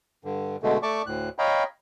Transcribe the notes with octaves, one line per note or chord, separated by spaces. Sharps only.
G2 D3
B2 D3 G#3 A3
A3 D5 A5 C#6 D6
D2 A2 F#6
C#5 D#5 F5 G5 A#5 B5